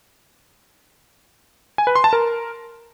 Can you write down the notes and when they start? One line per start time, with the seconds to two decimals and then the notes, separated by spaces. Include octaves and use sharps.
1.78 G#5
1.87 B4
1.95 C6
2.04 A5
2.13 A#4